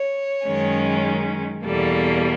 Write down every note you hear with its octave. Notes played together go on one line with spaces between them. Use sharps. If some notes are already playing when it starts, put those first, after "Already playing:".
Already playing: C#5
F#2 D#3 G#3 C#4
E2 B2 G3 A#3 A4